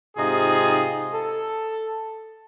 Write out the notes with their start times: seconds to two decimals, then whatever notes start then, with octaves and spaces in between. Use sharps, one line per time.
0.17 G#2 C3 D#4 F4 G#4
1.14 A4